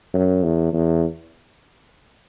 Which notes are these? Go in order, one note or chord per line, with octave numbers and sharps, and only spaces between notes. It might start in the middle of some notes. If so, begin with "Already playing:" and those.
F#2
E2
E2